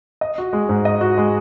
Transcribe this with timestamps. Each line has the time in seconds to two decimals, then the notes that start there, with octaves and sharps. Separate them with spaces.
0.21 D#5
0.38 F#4
0.53 G#3
0.69 G#2
0.85 D#5
1.01 F#4
1.18 G#3